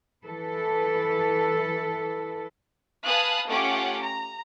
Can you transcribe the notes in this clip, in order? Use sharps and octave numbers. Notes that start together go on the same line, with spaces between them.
E3 A4 B4
B4 F5 G#5 A5 D#6 F#6
A3 C#4 F4 G4 F#5 D6
A#5